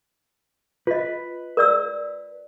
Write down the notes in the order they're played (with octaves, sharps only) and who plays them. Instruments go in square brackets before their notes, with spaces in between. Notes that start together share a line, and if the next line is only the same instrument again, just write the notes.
[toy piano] F4 D#5 [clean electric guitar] B4
[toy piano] A#4 D5 E6